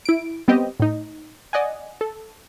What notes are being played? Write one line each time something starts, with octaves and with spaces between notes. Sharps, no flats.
E4 D7
G3 B3 C4 G4 D#5
A2 D#4
D5 D#5 F#5 G#5
A4